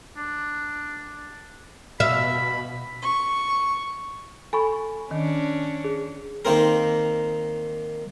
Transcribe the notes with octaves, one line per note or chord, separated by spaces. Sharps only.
D4
B2 E5 F5 B5
C#6
A4 G#5 B5 C#6
D#3 C#4 D4
G#4
D#3 A#3 C4 A#4